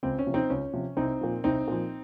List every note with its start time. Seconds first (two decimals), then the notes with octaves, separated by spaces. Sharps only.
0.03 C#2 C4
0.19 C#4
0.26 C3 F3
0.34 C4 D#4
0.50 C#2 C#4
0.74 C3 F3
0.97 C2 C4 D#4
1.21 A#2 F3
1.44 C2 C4 D#4
1.68 A#2 F3